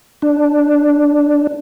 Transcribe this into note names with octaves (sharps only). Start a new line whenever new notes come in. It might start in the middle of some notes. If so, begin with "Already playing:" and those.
D4